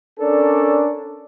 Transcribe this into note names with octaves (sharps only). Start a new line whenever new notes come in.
C#4 D4 A4 A#4 D5